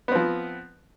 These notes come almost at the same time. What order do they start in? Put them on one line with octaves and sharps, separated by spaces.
B3 C4 F3